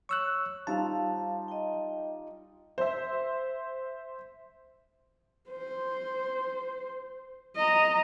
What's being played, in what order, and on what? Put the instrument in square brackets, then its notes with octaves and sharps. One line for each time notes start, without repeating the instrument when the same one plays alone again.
[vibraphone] C#5 [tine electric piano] C#6 E6 F#6
[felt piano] G3 D#4 F4 [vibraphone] C5 F5 [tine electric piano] A5
[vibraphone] D#5 G5
[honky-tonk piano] C5 E5
[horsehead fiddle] C5
D#5 A#5